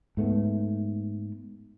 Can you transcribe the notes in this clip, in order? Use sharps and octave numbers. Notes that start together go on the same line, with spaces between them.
G#2 A3 B3